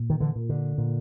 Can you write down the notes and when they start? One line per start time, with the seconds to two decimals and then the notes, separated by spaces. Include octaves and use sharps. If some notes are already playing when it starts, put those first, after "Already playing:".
Already playing: A#2
0.10 D#3
0.20 D3 E3
0.35 A#2
0.49 D3
0.78 A#2